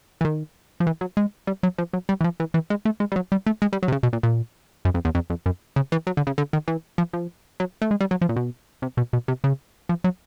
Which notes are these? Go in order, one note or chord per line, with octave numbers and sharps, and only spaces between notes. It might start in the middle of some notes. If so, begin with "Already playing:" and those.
E3
D#3
F3
E3
F#3
G#3
G3
F#3
F3
F#3
G3
E3
F3
E3
E3
G#3
A3
G#3
G3
F#3
G3
A3
G#3
G3
F#3
C3
C#3
B2
A#2
A#2
F#2
F2
E2
F2
F2
F#2
C#3
E3
F#3
D3
C#3
D3
D#3
E3
F3
F3
F#3
A3
G#3
G3
F#3
F3
A#2
B2
C3
B2
B2
C3
C#3
F3
F#3